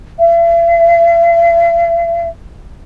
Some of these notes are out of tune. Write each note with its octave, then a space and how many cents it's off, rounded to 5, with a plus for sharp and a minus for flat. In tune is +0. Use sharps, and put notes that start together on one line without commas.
E5 +45